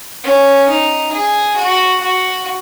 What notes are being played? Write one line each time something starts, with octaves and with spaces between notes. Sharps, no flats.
C#4
D#4
G#4
F#4
F#4